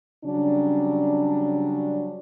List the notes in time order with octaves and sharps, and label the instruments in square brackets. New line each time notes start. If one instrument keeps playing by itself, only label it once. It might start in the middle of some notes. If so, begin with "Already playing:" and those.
[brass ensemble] C#3 F#3 G3 C#4 D4